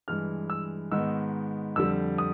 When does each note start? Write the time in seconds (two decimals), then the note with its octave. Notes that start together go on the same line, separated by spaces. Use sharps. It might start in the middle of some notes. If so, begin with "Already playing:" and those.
0.08 G2 E3 G#3 F6
0.50 E6
0.91 G#2 D#3 G#3 B3 E6
1.76 F2 D3 G3 E6
2.18 D#6